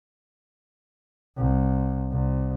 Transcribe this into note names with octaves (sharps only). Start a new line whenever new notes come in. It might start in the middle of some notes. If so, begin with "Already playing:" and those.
C2
C2